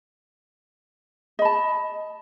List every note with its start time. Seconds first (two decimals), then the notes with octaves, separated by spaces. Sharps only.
1.39 D#5
1.42 B5
1.45 A5